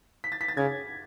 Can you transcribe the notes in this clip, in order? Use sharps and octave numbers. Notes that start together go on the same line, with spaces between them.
B6
A6
B6
A6
C#3 G#6